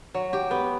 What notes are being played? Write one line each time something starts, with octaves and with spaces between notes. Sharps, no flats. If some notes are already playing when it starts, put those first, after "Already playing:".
F#3
G4
B3